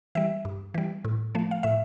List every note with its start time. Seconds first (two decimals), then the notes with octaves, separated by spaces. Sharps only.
0.15 E3 G3 E5
0.45 G2
0.74 E3 G3
1.05 A2
1.35 F3 A3
1.51 F5
1.63 A2 E5